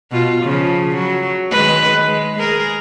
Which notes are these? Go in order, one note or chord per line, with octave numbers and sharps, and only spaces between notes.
B2 F4
C#3 F3
F#3
D#3 G#3 B4
G#3
G#4 A#4